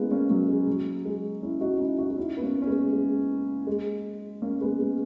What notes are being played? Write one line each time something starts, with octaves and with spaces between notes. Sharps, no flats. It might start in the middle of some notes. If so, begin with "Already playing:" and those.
Already playing: G#3 A#3 B3 C#4 E4
A#3 C#4
F#3 A#3
G#3
F#3
G#3
C#4 E4
D#4 F#4
F#4
C#4 E4
D#4 F#4
F#4
C#4 E4
B3
A#3 C#4
C#4
G#3 B3
G#3
G#3
A#3 C#4
G#3 B3
G#3 B3